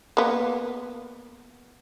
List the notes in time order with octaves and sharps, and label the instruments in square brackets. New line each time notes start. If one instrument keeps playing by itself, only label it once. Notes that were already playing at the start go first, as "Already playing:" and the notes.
[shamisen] A#3 B3